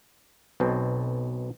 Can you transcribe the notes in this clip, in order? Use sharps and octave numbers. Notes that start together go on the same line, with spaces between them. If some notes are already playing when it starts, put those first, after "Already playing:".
B1 B2 C4